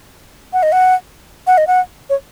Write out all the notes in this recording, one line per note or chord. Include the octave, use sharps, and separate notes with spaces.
F#5
D#5
F#5
F#5
D#5
F#5
C#5